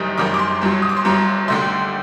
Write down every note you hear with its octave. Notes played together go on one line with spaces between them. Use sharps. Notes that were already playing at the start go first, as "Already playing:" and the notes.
Already playing: F#1 F#2 D#3 G3 D#6
F#1 F#2 D#3 G3 D6
D6
C6
G1 G2 F#3
D#6
D6
C6
G1 G2 F#3 A#5
D#2 D3 A3 C6